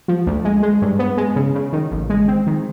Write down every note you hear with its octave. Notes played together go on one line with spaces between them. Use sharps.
F3
D2
G#3
G#3
G2
B3
G#3
C#3
C#3
D#3
A1
G#3
C4
D#3